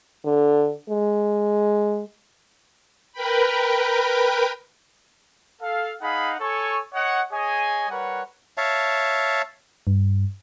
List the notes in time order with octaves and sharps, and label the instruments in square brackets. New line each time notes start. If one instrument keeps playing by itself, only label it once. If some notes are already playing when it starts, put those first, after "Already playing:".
[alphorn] D3
G#3
[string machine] A#4 B4 G5 B5
[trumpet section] A4 F5
D#4 G#4 F5 F#5 B5
A4 C#5 G#5 C#6
C#5 D#5 F#5
G#4 C#5 D#5 G#5
G3 A#4 B4 C#5 F#5
[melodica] C#5 E5 F5 A5
[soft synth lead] G2